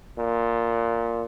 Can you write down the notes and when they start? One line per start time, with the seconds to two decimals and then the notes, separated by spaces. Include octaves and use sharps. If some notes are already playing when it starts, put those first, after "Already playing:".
0.18 A#2